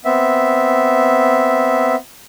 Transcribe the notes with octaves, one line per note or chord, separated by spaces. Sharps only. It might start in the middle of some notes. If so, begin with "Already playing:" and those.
B3 C4 E5